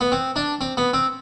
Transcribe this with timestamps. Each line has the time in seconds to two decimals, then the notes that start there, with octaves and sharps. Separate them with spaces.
0.01 B3
0.12 C4
0.36 D4
0.61 C4
0.77 B3
0.94 C4